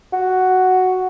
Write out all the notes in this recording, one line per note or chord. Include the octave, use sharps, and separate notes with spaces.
F#4